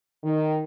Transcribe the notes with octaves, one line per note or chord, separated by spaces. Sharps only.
D#3